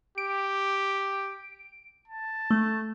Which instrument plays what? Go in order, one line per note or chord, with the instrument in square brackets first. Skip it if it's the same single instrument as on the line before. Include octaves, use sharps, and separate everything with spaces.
[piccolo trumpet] G4 [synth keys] D7
[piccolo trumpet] A5
[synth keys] A3